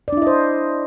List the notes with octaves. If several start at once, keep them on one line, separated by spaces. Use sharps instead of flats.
D4 E4 C5 D5 D#5